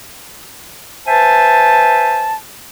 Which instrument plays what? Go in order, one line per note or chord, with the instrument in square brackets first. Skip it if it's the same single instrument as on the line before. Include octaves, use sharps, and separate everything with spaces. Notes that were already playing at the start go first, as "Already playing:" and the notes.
[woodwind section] B4 C5 E5 G#5 A5